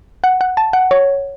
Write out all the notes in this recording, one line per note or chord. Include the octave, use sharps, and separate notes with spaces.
F#5
F#5
A5
F#5
C#5